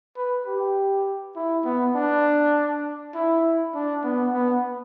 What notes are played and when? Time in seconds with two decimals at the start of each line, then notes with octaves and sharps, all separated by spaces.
0.17 B4
0.46 G4
1.36 E4
1.65 B3
1.95 D4
3.15 E4
3.74 D4
4.04 B3
4.33 B3